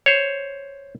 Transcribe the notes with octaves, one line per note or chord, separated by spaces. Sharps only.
C5 C#5